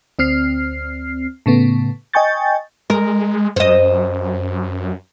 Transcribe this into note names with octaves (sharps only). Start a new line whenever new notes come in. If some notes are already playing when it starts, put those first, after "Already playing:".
D2 C4 F6 C7
A2 C#3 A3 B3
D#5 G5 G#5 C#6 G6 A6
G#3 A#4
F#2 C5 D#5